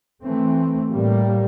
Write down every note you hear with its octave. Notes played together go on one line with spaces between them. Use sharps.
E3 A3 C4
A2 G3 A#3